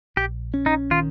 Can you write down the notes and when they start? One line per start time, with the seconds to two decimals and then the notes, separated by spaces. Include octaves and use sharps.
0.17 A#1 G4
0.54 C#4
0.66 D#4
0.91 D#3 F4